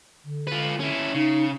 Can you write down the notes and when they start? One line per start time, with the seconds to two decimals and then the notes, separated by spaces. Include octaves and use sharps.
0.25 D3
0.47 F4 B4
0.80 C#4 E4
1.14 C#3 D#4